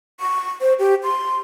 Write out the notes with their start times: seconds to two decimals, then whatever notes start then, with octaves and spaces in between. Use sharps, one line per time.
0.20 C#6
0.61 C5
0.79 G4
1.03 C6